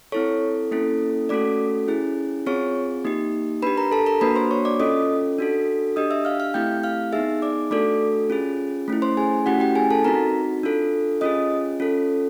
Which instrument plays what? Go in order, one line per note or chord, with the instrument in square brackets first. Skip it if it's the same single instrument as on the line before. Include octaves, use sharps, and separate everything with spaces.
[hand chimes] C4 E4 A4 C#5 C#6
A#3 C#4 E4 A4
A3 C#4 F#4 A4 D5 D6
C#4 E4 G#4
C4 F4 G#4 C#5 C#6
A#3 D#4 G4
D4 G4 B4 B5
A#4 A#5
A4 A5
A#4 A#5
A#3 D4 F#4 B4 B5
C5 C6
C#5 C#6
D5 D6
C#4 F4 A4 D#5 D#6
D4 F#4 A4
D4 G4 D#5 D#6
E5 E6
F5 F6
F5 F6
A3 C4 E4 G4 G5 G6
F5 F6
B3 D#4 G#4 E5 E6
D5 D6
A3 D4 F#4 A4 D5 D6
C#4 F4 G#4
A3 C#4 E4
C5 C6
G#4 G#5
A3 C#4 E4 F#4 G4 F#5
G4 G5
G#4 G#5
A4 A5
C4 D#4 F#4 A#4 A#5
D4 F4 A4
C#4 F4 G#4 D#5 D#6
C#4 F4 A4